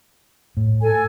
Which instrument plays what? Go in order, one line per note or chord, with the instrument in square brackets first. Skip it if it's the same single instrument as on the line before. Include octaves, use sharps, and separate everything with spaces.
[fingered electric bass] A2
[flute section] A4 G#5